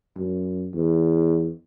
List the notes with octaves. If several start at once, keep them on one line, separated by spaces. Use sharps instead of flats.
F#2
E2